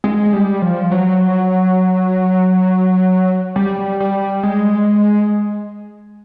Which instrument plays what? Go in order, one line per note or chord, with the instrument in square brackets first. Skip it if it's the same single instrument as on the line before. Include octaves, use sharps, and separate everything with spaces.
[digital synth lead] G#3
G3
F3
F#3
G3
G3
G#3